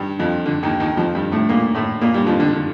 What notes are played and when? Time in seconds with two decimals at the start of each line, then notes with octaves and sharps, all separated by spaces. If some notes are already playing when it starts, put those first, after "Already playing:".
Already playing: G2 G3
0.19 F2 F3
0.46 D3
0.63 D#2 D#3
0.80 D#2 D#3
0.97 F2 F3
1.15 G2 G3
1.32 A2 A3
1.49 A#2 A#3
1.75 A2 A3
2.01 A#2 A#3
2.14 G2 G3
2.26 F2 F3
2.40 D3
2.53 D3